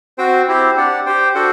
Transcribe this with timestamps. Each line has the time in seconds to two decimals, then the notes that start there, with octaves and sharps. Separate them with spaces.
0.18 C4 F#4 C5 G5
0.47 C4 E4 G4 C5
0.76 D4 G4 D5 F#5
1.06 G4 C5 G5
1.35 D4 F#4 A4 C5 F#5